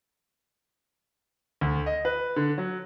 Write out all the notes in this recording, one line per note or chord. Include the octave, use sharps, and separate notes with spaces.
D2
D#5
B4
D3
F#3